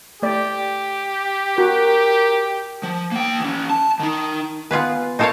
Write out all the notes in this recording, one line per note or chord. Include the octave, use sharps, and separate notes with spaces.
A3 G4 D5
F#4 A#4
F3
A#3 G5
E3 C#4
A5
D#3 D#4
B3 F4 G#4 B4
D#4 F4 A4 A#4 C#5 F5